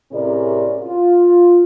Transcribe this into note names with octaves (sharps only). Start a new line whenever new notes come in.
A2 C3 C#4 G#4 A#4 D5
F4